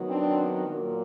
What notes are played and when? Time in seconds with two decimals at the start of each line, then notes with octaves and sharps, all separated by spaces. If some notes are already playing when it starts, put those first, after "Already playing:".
Already playing: D#3 F#3 B3
0.09 C4 D4
0.68 A#2 F#3 A#3